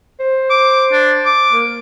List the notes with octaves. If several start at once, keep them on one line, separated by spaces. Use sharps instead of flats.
C5
D6
D4
D6
A#3